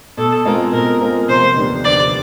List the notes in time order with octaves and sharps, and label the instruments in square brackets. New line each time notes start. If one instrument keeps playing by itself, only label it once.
[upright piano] B2 [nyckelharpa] A4
[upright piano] G#3 C4 F4 A#4
[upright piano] B2 [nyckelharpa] A#4
[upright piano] G#3 C4 F4 A#4
[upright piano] F1 [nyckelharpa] C5
[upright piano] D#2 D3 G3 B3
[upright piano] F1 [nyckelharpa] D5